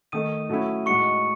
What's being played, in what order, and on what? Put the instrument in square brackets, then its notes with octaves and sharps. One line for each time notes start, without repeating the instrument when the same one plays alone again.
[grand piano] D#3 A3 D#4 [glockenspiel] D#6 D#7
[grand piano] F#3 A3 C#4 E4
[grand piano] A2 G#3 D#4 F#4 [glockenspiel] C#6 C#7